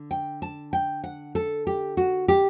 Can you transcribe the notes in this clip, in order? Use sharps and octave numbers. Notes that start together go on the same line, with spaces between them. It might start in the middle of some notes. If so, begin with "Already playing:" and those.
Already playing: D3 D4
G5
A5
G5
F#5
A4
G4
F#4
G4